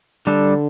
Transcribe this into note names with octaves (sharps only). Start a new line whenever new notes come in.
D3 G3 D4 A4